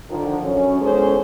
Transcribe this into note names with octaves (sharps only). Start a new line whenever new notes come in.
D3 D#3 F3
F#2 C#4
E2 D#3 G#3 C#4 A4 C5